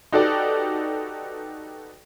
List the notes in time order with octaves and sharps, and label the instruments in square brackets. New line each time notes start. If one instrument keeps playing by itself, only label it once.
[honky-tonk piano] D#4 F#4 G4 A4 B4 D5